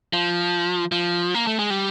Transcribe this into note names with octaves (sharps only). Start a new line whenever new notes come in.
F3
F3
A#3
A3
G#3
G3